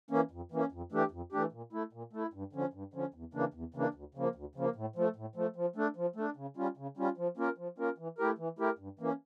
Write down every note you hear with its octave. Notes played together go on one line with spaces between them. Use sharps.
E3 A#3 C#4
F2
E3 A#3 C#4
F2
E3 A3 D4 G4
F2
E3 A3 D4 G4
A#2
A3 E4
A#2
A3 E4
G2
D3 F3 C#4
G2
D3 F3 C#4
E2
C#3 E3 A#3 D4
E2
C#3 E3 A#3 D4
D2
C#3 F3 A#3
D2
C#3 F3 A#3
A2
F3 A3
A2
F3 A3
F3
A3 D4
F3
A3 D4
C#3
G3 C#4 F4
C#3
G3 C#4 F4
F3
A#3 C#4 F4 A#4
F3
A#3 C#4 F4 A#4
E3
A3 E4 G4 A#4
E3
A3 E4 G4 A#4
G2
E3 A#3 C#4